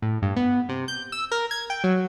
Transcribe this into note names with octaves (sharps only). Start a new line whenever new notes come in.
A2
G2
B3
C3
G6
E6
A#4
G#6
G5
F#3